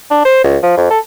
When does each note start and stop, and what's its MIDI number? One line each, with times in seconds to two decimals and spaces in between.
0.11 0.23 62
0.25 0.41 72
0.44 0.57 37
0.63 0.72 53
0.77 0.90 41
0.90 0.99 69